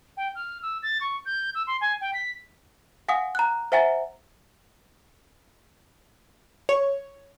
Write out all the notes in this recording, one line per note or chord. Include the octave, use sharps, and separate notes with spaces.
G5
F6
E6
A6
C#6
G6
E6
C6
G#5
G5
B6
F5 F#5 G#5 D#6
A#5 F#6
C5 E5 F#5 G#5 A#5 A6
C#5